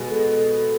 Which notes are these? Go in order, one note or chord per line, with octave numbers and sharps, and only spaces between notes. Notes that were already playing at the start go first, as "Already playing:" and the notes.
Already playing: B2 G#3 B3
A4
A4